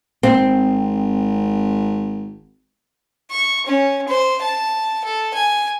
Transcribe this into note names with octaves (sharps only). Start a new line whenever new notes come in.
G#1 C4
C#6
C#4
C5
A5
A4
G#5